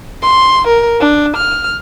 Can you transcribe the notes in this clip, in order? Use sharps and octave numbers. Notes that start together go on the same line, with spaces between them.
C6
A#4
D4
F6